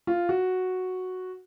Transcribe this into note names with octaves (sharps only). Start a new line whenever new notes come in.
F4
F#4